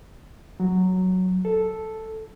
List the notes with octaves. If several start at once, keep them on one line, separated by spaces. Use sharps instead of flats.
F#3
A4